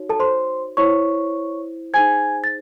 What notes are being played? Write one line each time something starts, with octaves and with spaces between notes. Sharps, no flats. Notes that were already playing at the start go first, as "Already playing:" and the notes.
Already playing: D#4 F#4 C#5
A4 A5
C5 C6
E4 C5 C#5 C#6
D#4 G#4 C5 G#5 G#6
A6